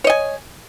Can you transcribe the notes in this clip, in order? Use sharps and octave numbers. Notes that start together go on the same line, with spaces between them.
C#5 D#5 G#5